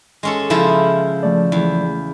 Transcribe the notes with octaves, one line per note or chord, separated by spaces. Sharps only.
G#3 C#4 A4
C#3 F3 E4 A4
F3 A3 D5
E2